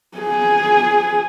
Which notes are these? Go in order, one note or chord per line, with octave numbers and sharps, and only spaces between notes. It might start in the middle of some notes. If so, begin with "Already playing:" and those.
G#4